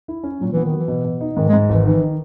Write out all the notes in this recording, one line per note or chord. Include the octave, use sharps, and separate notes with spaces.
E4
C#4
A#2 F#3
E3 B3
D#3
F#3
E3
B2
B2
D#4
G#2 D#3
G#3
G#2
G#1 E3
D#3 E3
D#3